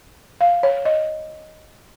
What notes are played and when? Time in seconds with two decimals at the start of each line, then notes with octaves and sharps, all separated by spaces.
0.41 F5
0.63 C#5
0.85 D#5